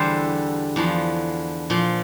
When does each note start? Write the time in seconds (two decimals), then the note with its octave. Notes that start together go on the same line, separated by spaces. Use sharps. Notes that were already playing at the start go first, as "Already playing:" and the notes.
Already playing: E2 D3 G3 A4 C5
0.76 E2 D3 F3
1.70 A#2 F3